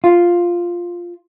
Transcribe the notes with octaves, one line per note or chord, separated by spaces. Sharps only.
F4